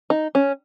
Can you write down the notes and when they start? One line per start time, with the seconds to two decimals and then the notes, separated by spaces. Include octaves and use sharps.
0.10 D#4
0.35 C#4